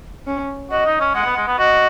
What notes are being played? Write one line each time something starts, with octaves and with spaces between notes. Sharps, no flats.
C#4
F#4 D#5
D#4
C#4
G#3 F#5
B3
G#3
B3
F#4 D#5